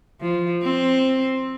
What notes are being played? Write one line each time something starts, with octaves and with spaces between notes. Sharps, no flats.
F3
C4